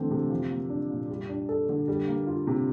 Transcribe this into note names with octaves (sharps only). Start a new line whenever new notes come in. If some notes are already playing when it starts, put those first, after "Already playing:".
Already playing: D3 E3 A3 C4
C3
F3
A#3
D4
A#2
G3
D4
A4
D3
G3
A#3
F4
C3